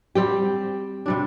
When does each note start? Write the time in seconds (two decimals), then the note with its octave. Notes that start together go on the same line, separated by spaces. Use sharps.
0.15 G3 C4 G4
1.06 C3 G3 D4